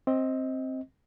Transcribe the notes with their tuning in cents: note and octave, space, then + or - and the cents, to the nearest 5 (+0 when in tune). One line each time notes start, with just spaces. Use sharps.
C4 +10 D#5 +20